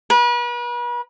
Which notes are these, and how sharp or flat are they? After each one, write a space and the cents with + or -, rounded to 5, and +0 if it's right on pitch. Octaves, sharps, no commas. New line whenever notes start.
B4 -40